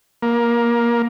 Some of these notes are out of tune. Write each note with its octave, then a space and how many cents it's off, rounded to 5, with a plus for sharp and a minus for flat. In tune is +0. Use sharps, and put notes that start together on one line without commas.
A#3 +20